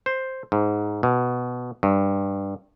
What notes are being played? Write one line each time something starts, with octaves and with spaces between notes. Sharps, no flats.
C5
G#2
B2
G2